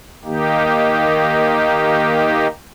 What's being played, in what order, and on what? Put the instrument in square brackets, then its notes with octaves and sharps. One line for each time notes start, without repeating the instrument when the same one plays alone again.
[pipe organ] D#3 A#3 D#4 G4